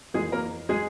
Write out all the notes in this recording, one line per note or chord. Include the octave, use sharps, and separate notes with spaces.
F2 E3 G#3 A#3 G#4
A#3 A#4
G#3 G#4